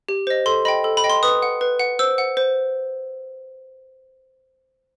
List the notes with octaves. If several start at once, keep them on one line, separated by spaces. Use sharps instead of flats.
G4
C5 D#5
A4 C6
D#5 G5 B5
A4
B5
D#5 G5
C6
B4 D#6
F#5
B4
F#5
C5 E6
F#5
C5